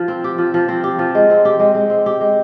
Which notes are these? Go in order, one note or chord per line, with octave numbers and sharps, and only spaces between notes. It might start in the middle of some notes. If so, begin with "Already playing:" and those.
Already playing: F3
C4
G4
F3
F3
C4
G4
F3
G#3
C4
G4
G#3
G#3
C4
G4
G#3